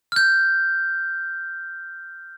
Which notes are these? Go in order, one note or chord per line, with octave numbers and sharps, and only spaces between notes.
F6 G6